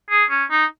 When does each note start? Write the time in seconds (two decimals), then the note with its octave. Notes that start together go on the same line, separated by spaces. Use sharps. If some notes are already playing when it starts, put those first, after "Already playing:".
0.10 G#4
0.30 C#4
0.51 D#4